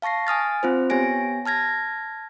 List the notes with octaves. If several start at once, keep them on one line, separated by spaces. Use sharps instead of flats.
F5 A5 C#6 A#6 C7
G#5 D#6 F6 A6
C4 F4 C5
B3 G4 C#5 G#5 A#6 D7
A5 F6 G#6 A#6